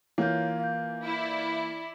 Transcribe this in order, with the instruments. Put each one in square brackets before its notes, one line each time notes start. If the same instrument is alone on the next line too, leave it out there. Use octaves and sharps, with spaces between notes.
[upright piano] E3 [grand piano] A#3 F4 [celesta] C#5 G6
[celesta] F5 G6
[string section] E4 D5